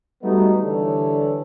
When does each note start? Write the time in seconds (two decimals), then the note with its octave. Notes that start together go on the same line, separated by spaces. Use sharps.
0.23 G3 A3 B3 D#4 F#4 D#5
0.63 D3 E3 G3 A4 C#5 D5